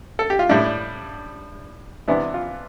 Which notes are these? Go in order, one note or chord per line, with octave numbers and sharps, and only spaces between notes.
A4
G4
F4
A2 G3 D4 E4
C3 E3 B3 D4 E4
F4